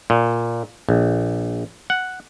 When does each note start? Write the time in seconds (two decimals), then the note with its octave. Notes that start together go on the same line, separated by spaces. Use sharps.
0.10 A#2
0.89 A#1
1.90 F#5